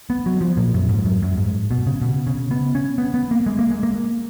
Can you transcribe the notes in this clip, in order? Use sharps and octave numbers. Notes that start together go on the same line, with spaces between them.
B3
F#3
F3
A#2
F#2
G#2
F#2
F#2
G#2
B2
C#3
B2
C#3
B3
C#4
B3
B3
A#3
G#3
A#3
G#3
A#3